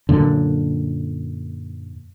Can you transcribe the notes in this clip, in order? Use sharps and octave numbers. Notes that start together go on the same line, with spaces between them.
F#2 A#2 D3